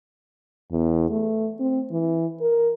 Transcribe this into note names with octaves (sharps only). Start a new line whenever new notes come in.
E2
A3
C4
E3
A#4